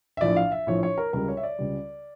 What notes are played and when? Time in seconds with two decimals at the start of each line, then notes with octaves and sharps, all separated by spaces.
0.17 E5
0.21 A#1 A2 F3 D5
0.36 F5
0.52 E5
0.67 A#1 A2 F3 C#5
0.83 C#5
0.98 A#4
1.13 C#2 C#3 G3 A#4
1.28 C#5
1.37 E5
1.43 D5
1.59 C#2 C#3 G3